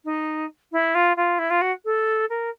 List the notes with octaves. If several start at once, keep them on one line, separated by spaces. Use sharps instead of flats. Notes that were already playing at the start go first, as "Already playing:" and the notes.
D#4
E4
F4
F4
E4
F4
F#4
A4
A#4